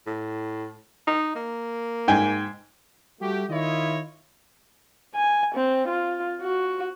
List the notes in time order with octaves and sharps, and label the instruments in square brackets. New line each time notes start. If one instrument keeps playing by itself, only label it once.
[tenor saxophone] A2
D#4
A#3
[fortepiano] G#2 G5 G#5
[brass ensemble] G3 A3 F#4 G4
D#3 E4 F4 C#5 D#5
[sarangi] G#5
C4
F4
F#4